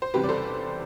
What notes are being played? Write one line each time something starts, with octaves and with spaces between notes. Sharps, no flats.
C5
F#1 E2 C3 G3 C4 G4 B4
D5
A4 C5